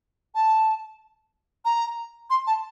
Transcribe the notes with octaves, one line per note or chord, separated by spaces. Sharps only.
A5
A#5
C6
A5